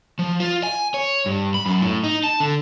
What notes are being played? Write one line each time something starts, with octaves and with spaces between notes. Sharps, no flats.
F3
F4
G#5
C#5
G2
B5
F#2
A2
D#4
A5
D3